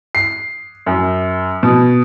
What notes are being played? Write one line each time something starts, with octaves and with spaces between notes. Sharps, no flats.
C7
F#2
B2